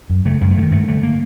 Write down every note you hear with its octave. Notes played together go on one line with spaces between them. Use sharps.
F#2
C#3 A3
F#2 G#3
A3
C#3
D#3
G2 A3
D3 A3
A#3